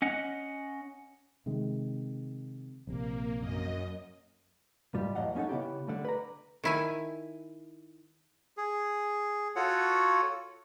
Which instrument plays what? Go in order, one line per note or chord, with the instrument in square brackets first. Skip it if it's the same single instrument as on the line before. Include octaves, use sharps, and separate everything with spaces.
[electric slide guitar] C#4 D#5 F#5
[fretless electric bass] C3 D#3 G#3
[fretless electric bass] A#1 C3 [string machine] A#3
[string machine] F#2 D#5
[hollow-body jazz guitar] C2 G#2 G3 F4 G4
E2 A2 F#3 D#5 F5 F#5
A#3 C#4 D#4 A4 F#5
C#3 B3 E4 G4
D3 G3 A3
B4 D5 A#5
[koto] D#3 E4 G#5
[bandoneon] G#4
F4 F#4 A4 C#5 F#5